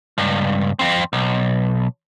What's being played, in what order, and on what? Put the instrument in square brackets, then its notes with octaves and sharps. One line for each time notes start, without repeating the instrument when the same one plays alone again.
[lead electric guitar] C#2 G2
F2 C4
B1